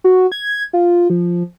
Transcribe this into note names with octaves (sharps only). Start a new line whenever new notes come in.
F#4
G#6
F4
F3